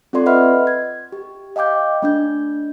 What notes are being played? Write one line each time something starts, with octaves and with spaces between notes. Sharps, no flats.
C4 F4 A4 D5 C6
B4 D#5 E5 F#5 B5 F6
G#6
G4
D#5 F5 G5 D6 G6
A3 D4 G6